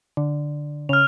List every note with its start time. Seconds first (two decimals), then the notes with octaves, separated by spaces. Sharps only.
0.17 D3
0.89 C#3 F6 F7